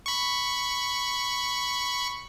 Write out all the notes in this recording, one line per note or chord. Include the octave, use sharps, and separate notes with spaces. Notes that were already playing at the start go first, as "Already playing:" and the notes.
B5 C#6